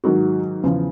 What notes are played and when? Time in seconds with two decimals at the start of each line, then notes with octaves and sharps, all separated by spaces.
0.04 G#2 D#3 F#3 F#4
0.64 E2 C#3 F3